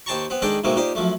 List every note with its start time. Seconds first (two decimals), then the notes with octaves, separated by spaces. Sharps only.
0.06 D#2 C5 G5 A5 A#5 C#6
0.30 B3 C4
0.42 D#3 G#3 D4 A4 D#5 G5
0.64 G#2 B2 A3 A#3 C4
0.76 A#2 D#4 G4 C5
0.95 F#2 F3 A3